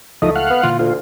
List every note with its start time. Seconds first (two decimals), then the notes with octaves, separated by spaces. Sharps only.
0.22 C#2 F3 A3 D#4 D#5
0.36 F5 F#5
0.50 B3
0.63 A#2 D3 E3 F4
0.79 D2 F4